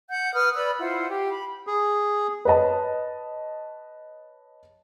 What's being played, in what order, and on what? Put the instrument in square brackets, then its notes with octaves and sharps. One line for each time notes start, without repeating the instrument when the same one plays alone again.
[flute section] F#5 G6
B4 D#6 F6
B4 D5 B5 E6
E4 F4 C5 F#5
G4
B5
[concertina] G#4
[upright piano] B4 C#5 D#5 A5